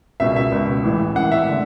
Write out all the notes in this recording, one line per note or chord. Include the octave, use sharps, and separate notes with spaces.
C#2 B2 E5
E5
C#2 B2
A1 A2 E3
A1 A2 E3 F#5
E5
D3